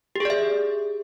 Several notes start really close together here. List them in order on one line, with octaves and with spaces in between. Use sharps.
G4 G#4 D5 E5